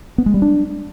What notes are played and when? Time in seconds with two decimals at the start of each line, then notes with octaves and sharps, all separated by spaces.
0.18 B3
0.26 G#3
0.34 G3
0.42 D4